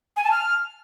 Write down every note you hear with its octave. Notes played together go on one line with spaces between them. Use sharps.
G#5
A5
F6